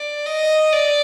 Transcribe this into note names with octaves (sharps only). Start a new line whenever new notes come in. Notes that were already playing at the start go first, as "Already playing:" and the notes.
Already playing: D5
D#5
D5